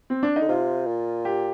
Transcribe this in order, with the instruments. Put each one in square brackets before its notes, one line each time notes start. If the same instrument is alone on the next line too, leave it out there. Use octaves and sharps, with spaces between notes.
[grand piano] C4
D4
D#4
[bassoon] D3
[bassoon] C3 [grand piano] F4
[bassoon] A#2
[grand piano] G4